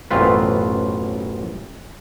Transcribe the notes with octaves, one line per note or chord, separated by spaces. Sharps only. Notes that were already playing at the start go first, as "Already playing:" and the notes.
A1 F#2 B2 C4 F4 B4